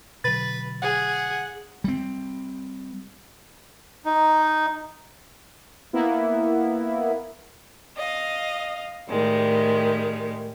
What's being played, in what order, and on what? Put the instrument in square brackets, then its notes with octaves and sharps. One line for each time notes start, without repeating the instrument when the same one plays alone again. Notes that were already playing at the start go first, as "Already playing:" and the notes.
[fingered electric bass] B2 D3 F#3 [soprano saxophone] B4 [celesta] A6
[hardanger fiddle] G#4 [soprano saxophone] F#5
[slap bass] G3 C4
[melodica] D#4
[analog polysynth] A#3 B3 E4
[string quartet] D#5 F5
A2 D#3 G3 G#3